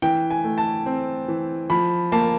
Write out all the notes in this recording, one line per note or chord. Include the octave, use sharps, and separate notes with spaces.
E3 G5
G#5
A3
A5
C4
E3
F3 B5
A#3 A5